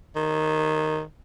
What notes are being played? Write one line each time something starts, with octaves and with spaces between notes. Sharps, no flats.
D#3